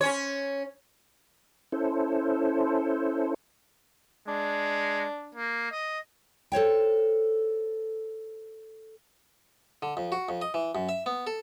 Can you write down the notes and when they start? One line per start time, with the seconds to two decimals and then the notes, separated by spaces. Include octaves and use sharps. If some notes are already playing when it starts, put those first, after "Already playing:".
0.01 C#4 C#5
1.72 C#4 E4 A4 C5
4.28 G#3 D4
5.35 A#3
5.71 D#5
6.52 A4 C5 C#5 G5
9.82 D3
9.97 F2
10.12 F#4
10.29 F2
10.42 D#5
10.54 E3
10.75 F#2
10.89 E5
11.06 B3
11.27 A4